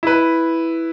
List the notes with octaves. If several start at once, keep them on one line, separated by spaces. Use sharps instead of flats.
E4 B4